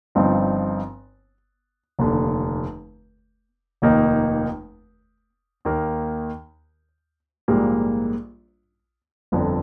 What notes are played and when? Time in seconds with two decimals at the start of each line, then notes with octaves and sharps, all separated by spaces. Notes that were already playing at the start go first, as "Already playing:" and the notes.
0.15 G1 G2 F3 C4 D#4
1.99 F1 D#2 D3
3.82 F1 D#2 D#3 A#3 D#4
5.65 D#2 D#3 A#3
7.48 A#1 G#2 G3 A#3
9.32 G1 F2 D3